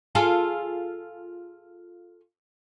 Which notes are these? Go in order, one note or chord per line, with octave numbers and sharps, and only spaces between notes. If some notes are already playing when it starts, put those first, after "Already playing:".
F4 G#4 A4